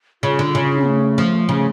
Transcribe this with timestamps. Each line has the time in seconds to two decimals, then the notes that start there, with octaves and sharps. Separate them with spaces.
0.22 C#3 F4
0.39 D3
0.55 C#3
0.86 A3
1.18 F3
1.49 C#3 A3